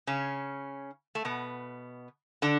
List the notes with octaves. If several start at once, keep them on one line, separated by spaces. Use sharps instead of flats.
C#3 C#4
A3
B2 B3
D3 D4